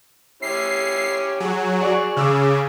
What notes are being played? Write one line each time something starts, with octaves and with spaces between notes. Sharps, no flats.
C#4 E4 G4 C7
F#3 G#4
F#4 D5 C#6
C#3 D6 E6 F6